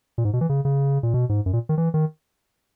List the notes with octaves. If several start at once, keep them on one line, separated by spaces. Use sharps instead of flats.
A#2
G#2
B2
E3
C#3
C#3
A#2
B2
G#2
F#2
A#2
D#3
E3
D#3